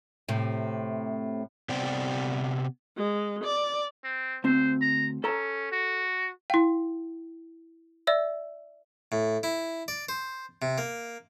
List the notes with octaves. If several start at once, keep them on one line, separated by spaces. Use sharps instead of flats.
A2 C3
C3 B3 C5 D5 G5
G#3
D5
C4
D2 C4 C5
A#5
C#4 A4 A#5
F#4
E4 F5 G5
D5 E5 E6
A2
E4
D5
C5
C3
A#3